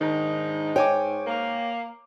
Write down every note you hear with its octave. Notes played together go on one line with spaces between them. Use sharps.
G#2 D#3 D4 D#4
C#5 G5 G#5 D6
A#3